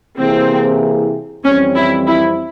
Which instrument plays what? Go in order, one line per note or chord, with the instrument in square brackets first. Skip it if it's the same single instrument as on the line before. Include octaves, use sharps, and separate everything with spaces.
[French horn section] C3 E3 A#3 E4 G#4 [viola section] C4
[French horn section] F2 E3 G3 C4 [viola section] C#4
[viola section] E4
E4